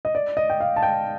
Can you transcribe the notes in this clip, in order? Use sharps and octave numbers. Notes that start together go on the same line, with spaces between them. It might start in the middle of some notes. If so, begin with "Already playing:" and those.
D#5
D5
D#5
G5
F5
A5
G5